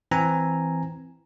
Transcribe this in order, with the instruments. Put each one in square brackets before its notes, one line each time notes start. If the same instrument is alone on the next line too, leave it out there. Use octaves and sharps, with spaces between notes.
[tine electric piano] E3 C4 G#5 A#5